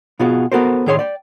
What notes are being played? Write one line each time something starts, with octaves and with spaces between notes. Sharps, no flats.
B2 B3 F4 F#4 G#4
B3 F#4 A4 A#4 C5
A2 D#3 G#4 C#5 E5 C6
D5 G5